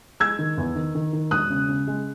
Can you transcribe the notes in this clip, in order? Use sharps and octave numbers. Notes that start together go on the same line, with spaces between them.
G#3 E6 G#6
D#3
E2
D#3
D#3
D#3
E1 D#6 F#6
C#3
C#3
G#3